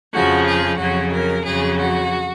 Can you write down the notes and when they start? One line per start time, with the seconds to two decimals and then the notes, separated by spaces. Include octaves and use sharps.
0.12 F2 C#3 F3 F#4
0.45 G#4
0.79 F2 C#3 F#3 F#4
1.13 A#4
1.45 F2 C#3 F#3 G#4
1.78 F#4